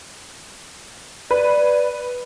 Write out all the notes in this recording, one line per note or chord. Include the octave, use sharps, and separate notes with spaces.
B4 D5